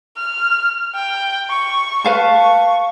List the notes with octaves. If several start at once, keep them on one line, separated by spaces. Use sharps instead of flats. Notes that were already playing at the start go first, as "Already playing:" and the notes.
F6
G5
C#6
B4 F5 A5
C#6